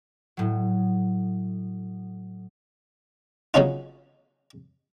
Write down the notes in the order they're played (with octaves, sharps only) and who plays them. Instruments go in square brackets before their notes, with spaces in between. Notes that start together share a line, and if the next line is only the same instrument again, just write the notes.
[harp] A2 F#3
[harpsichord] C#3 F#3 B3 C#4 D#4 F4